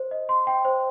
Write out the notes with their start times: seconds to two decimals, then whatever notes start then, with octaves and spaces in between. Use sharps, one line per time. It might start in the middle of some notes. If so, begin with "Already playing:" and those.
Already playing: C5
0.11 D#5
0.29 C6
0.47 G5
0.65 C5